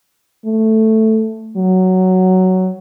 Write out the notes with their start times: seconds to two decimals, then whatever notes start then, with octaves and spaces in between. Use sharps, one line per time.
0.45 A3
1.56 F#3